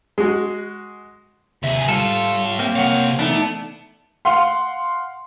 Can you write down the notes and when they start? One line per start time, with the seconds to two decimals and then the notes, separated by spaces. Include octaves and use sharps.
0.18 G#3 F#4
1.63 D#2 C3 G#4 E5
1.89 G3 F4 A4 C#5 E5
2.59 A#3 C4
2.76 C3 C#5 F5 F#5
3.19 E3 A3 B3 D4 D#4
4.25 F5 F#5 C6